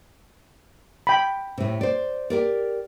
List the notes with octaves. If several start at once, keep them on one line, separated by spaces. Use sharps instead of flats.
G5 B5
A2 C3
C5 D5
G4 A#4 D5